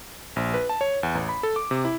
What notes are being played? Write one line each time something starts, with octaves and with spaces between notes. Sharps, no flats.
A#1
B4
A5
C#5
E2
A1
B5
A4
D6
C3
E4